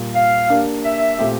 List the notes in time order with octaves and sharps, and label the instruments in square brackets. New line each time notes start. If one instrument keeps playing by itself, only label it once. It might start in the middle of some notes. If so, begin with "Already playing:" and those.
Already playing: [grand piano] A#2 G3 A#3
[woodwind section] F5
[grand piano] A#3 D4 G4 A#4 D5
[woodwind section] E5
[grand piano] A#2 A3 C4 G4